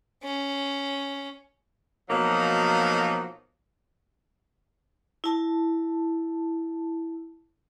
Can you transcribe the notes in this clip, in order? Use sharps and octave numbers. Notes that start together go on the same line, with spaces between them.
C#4
B2 F3 F#3 A#3 D#4
E4 A5